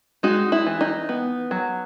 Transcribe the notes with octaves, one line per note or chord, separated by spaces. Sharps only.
G#3 D#4 F#4
E4
E3
D#4
B3
F#3